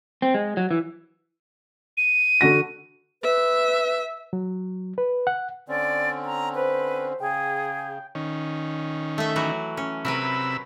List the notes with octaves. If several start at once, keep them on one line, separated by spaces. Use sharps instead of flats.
C4
G#3
F#3
E3
D#7
D3 F#4 A#6
B4 E5
F#3
B4
F#5
D3 C4 C#4 D5
A#5
B4 C5
C#3 G#4 G5
D#3 C#4
A3 E5
E3 F#3 F#4
C#4
C3 F#3 A#4 B4 B5 E6